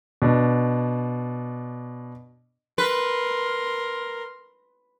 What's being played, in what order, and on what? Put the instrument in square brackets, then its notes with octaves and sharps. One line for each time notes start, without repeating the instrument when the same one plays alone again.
[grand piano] B2 D4
[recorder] A#4 [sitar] B4 [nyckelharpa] C6